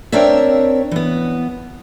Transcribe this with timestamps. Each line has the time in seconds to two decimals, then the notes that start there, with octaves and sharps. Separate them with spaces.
0.12 C4 D4 A#4 C#5 E5
0.91 E3 B3